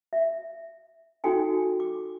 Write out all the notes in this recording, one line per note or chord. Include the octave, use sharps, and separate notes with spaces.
E5
D#4 F#4 A4 G5 G#5
D6